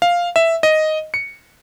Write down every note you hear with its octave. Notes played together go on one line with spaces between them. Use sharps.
F5
E5
D#5
C#7